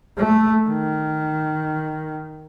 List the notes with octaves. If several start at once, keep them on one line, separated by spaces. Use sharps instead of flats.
A3
D#3